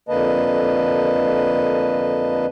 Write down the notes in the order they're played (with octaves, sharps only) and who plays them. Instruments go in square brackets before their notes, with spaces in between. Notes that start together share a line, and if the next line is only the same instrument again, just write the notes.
[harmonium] F2 D3 A#3 B4 D#5 A5